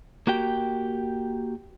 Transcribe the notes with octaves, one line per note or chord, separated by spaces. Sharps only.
A#3 F#4 G4 G5